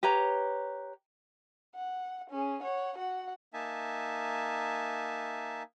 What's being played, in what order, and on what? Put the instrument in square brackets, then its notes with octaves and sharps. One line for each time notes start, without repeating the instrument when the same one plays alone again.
[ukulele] G4 B4 C#5 A#5
[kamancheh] F#5
C#4 G#4
C#5 F#5
F#4 F#5
[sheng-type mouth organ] A#3 D#4 E5 G#5 A5